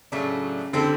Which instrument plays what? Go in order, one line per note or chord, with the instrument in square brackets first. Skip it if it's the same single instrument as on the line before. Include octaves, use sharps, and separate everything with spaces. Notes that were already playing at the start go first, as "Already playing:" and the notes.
[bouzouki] A2 F#3 A3 D4 [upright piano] C#3
[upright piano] D3 [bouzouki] G3 C4 E4 A4